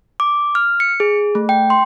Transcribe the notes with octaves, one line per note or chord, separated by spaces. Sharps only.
D6
F6
C#7
G#4
A3
G5
C6